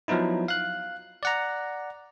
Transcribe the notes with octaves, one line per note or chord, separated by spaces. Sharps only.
F3 F#3 B3 D#4 E4
F5 F#6
D5 F#5 A#5